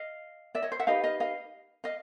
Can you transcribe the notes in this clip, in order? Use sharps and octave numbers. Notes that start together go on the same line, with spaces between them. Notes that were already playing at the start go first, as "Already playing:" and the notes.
Already playing: D#5 F5
D5 E5
C#5 D#5
C5
E5 F#5
D#4 G4 B4 D#5 F5
D#5 F5
D#5 F5
D#5 F5